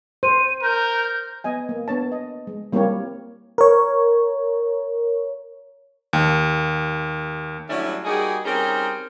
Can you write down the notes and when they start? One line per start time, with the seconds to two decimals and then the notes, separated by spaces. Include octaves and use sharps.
0.23 C5 D#7
0.62 A#4 G6
1.44 B3 D#5 G#5
1.69 A#3
1.88 B3 D4 C#5 A5
2.12 D#5
2.47 G#3
2.73 G3 A#3 C4 E4 G4 C#5
3.58 A#4 C#5
6.13 D#2
7.69 F#3 G3 A3 C#4 D4 E4
8.05 G3 A#3 D#4 F#4 G#4
8.45 G3 C4 C#4 D#4 G#4 A#4